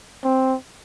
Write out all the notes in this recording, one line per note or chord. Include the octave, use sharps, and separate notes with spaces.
C4